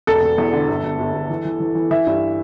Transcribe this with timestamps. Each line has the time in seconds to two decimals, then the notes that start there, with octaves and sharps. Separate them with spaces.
0.07 E1 A4
0.22 E1
0.38 E2
0.53 D3
0.68 G1
0.84 G1
0.99 G1
1.14 G1
1.29 E3
1.45 E3
1.60 E3
1.75 E3
1.91 E3 E5
2.07 G2